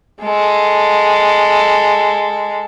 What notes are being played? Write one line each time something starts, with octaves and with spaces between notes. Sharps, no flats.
G#3 A4